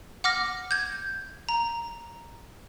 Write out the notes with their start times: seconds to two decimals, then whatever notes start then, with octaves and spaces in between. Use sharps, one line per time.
0.24 F#5 D6 F6 A#6
0.71 G6 G#6
1.49 A#5